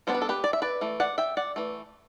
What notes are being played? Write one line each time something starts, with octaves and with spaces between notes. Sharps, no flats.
G3 B3 D4 C5
B4
A4
G4 B4
D5
E5
B4 D5
E3 A3
D5 F#5
E5 G5
D5 F#5
E3 A3